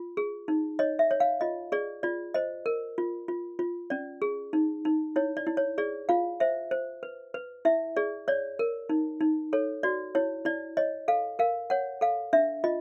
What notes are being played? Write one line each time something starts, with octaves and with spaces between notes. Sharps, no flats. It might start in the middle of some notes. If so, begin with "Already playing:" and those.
Already playing: F4
G#4
D#4
C#5 D#5
E5
C#5
F5
F4 D#5
G#4 D5
F4 D5
C5 D#5
A#4
F4
F4
F4
C#4 D5
G#4
D#4
D#4
E4 C#5
D5
E4
C#5
G#4 D5
F4 F5
C5 E5
C5
B4
B4
E4 E5
G#4 D5
C#5 D5
A#4
D#4
D#4
A4 C#5
F#4 D5
E4 C#5
E4 D5
C#5 D#5
A4 F5
A#4 F5
C#5 F#5
A4 F5
D4 E5
F4 D#5